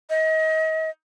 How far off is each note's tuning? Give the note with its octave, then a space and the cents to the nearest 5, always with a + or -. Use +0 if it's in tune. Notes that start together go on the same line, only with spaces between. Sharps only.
D#5 +35